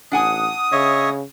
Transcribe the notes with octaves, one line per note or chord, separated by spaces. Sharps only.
A1 D4 F#5 G#5 D#6
C#3 C#5 D#5 E5